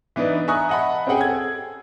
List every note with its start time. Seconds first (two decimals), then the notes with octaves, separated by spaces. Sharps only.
0.16 E3 B3 D4 D#4 B4
0.48 E5 G#5 A#5 C#6 D#6 F#6
0.69 D#5 E5 F#5 A5 B5
1.07 C4 C#4 G4 G#4 F#5 G5
1.21 A4 G#6